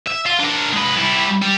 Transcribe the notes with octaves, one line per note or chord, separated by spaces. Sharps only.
E5
F4
D4 A#4
G#3 B4
G3 E4
G3